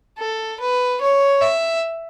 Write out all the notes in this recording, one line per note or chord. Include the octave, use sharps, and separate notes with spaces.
A4
B4
C#5
E5